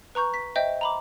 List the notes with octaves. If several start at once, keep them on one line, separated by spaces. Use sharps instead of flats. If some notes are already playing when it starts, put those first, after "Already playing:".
B4 A#5 C#6 G6
B6
C5 D#5 E5 G5 G6
A#5 B5 D6